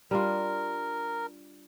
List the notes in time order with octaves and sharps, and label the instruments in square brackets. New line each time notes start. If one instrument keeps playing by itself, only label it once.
[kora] G3 D4 F4 [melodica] A#4